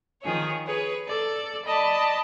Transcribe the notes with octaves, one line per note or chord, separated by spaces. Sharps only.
D#3 F3 G#4 C#5
G#4 B4 C#5
A4 D5
D5 D#5 A5 B5